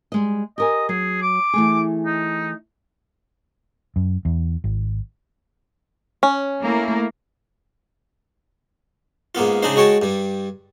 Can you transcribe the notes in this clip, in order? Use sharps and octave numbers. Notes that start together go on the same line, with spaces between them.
G3 G#3 D#5
G4 A#4 D#5 G#5
F#3 G#4
D6
E3 A3 G#4
D#4
F#2
E2
G#1
C#4
A3 A#3 E4
G#2 A#3 B3 F4
C#3 G#3 D4 D#4 C5
G#3 F#4 C#5 G5 A5
G2 G3